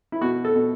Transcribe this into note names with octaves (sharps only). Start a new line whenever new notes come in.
E4
B2 F#4
A4
B2